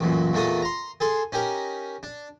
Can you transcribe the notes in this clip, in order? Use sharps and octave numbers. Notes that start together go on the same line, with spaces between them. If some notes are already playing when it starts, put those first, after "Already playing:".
A1 F#2 A#2
E2 A#2 A3 D4 D#4 D#6
A#5 C6
G#4 A4 C6
C#4 D#4 G4 A#4
D4